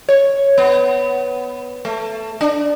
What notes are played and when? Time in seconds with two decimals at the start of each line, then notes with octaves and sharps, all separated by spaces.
0.09 C#5
0.58 B3
1.85 A3
2.41 D4